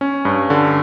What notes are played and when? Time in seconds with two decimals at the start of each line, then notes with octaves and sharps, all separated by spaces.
0.01 C#4
0.25 G2
0.50 D3